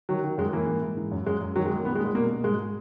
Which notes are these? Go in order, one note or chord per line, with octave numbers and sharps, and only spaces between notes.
D#3 F#3
D#3
F#2 G#3
E3 A#3
G#2
G#2
E3
F#2
F#2 G#3
F#2
D#3 F#3
G#3
D#3
A#3
A#2 B3
G#3
A#2
G#3
B2 A#3
B2
G#2 G#3